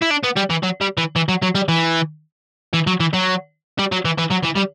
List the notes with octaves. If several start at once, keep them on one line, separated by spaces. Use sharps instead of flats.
E4
D4
B3
G3
E3
F#3
G3
E3
E3
F#3
F#3
G3
E3
E3
F#3
E3
F#3
G3
F#3
E3
E3
F#3
E3
G3